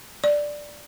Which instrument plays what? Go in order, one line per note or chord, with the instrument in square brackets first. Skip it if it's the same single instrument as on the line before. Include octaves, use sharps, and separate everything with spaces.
[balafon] D5